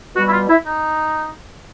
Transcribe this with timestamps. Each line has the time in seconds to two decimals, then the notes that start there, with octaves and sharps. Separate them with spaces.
0.15 B2 G3 F#4
0.27 E4
0.32 F4
0.49 E4
0.66 D#4